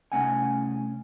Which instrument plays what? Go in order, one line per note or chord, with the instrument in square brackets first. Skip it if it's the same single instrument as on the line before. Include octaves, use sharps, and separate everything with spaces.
[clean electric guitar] C2 C3 A3 C#4 F#5 G#5